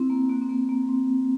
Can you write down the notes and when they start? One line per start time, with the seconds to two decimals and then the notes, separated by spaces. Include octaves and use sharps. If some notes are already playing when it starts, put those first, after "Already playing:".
Already playing: C4 E4
0.10 A#3
0.30 A#3
0.41 C4
0.49 A#3
0.69 A#3
0.89 C4